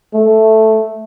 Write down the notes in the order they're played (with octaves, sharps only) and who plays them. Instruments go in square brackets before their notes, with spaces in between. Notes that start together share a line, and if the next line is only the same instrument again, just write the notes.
[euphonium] A3